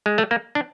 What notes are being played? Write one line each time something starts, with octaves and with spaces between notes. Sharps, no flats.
G#3
A3
A#3
D4